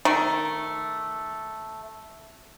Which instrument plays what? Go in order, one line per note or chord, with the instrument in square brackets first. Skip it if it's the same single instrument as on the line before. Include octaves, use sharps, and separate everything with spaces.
[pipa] D#3 A3